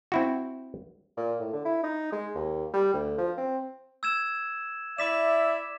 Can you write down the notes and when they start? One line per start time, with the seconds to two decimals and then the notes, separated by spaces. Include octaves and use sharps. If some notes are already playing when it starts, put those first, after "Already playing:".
0.12 C4 E4 F#4
1.17 A#2
1.40 A2
1.53 D3
1.65 E4
1.84 D#4
2.12 G#3
2.35 D#2
2.74 G3
2.94 D2
3.18 F3
3.37 C4
4.03 E6 G#6 E7
4.98 E4 D5 E5 D6 B6 E7